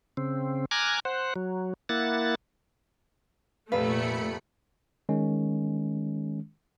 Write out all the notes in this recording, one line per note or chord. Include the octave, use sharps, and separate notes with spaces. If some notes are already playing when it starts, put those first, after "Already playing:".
C#3 C4
G#5 A#5 D6 F6 F#6 G#6
C5 F#5
F#3
A#3 E4 F#5 A6
F1 A#2 A3 B4 F5 B5 C#7
D#3 G#3 C#4